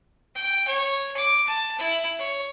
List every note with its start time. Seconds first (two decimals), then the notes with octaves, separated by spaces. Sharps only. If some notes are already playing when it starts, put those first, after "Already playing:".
0.35 G5
0.67 C#5
1.16 D6
1.47 A5
1.78 E4
2.19 C#5